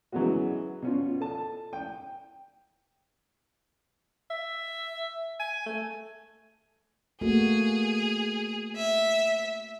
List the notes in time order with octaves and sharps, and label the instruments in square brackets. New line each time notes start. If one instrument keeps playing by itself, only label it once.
[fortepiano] E3 F#3 G#3 B3 C#4 F#4
B2 C#4 F4
A4 A5
G5
[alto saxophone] E5
G#5
A3
[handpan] A3 A#3 F#4 [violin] G#4
[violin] E5